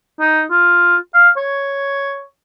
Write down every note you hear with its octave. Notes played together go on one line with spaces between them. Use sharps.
D#4
F4
F5
C#5